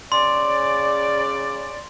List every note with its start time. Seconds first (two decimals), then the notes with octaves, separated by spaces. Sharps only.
0.12 C#3 D5 C6